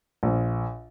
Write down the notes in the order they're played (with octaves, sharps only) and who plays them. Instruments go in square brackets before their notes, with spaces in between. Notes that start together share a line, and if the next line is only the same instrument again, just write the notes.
[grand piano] A#1